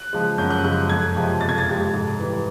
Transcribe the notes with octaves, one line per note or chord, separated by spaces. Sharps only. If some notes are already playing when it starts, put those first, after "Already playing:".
Already playing: F#6
C#3 F3 G#3
F#2 G6
F#6
C#3 F3 G#3 F#6
F2 G#6
C3 F3 G#3
F2 A6
G#6
A6
C3 F3 G#3
G#2
E3 G3